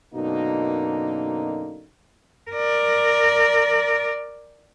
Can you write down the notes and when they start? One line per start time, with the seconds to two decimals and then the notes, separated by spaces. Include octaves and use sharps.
0.14 F#2 B2 D3 A#3 D#4
2.51 A#4 D5